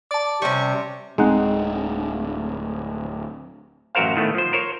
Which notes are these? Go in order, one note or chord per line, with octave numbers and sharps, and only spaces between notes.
D5 A5 D6
C3 G3 C#4 C#6
D1 G#3 C4 D#4 F#5
A1 F#2 F#4 A#4 C5 F5
A2 D#3 A3 B3
F3 C5
A#4 C5 C#5